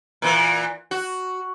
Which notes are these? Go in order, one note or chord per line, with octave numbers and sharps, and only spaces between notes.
A#2 E3
F#4